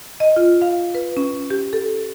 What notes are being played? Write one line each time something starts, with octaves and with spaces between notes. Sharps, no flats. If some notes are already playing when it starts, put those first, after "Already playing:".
D#5
F4
F5
B4
C#4
G4
A4